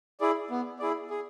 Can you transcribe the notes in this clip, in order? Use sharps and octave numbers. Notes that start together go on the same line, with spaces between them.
E4 G#4 D5
B3
E4 G#4 D5
G#4